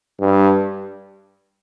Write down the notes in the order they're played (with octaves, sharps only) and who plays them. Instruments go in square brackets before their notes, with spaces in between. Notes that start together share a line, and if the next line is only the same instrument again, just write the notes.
[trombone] G2